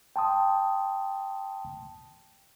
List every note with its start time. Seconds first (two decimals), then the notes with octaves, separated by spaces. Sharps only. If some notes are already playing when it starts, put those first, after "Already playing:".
0.16 G5 A5 C6 D#6